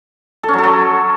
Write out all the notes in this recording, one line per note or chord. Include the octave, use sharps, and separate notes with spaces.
A4
C#4
F#3
A4
F#3